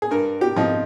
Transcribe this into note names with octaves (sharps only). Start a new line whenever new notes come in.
G#4
G2 A#4
G4
F3 C4 D#4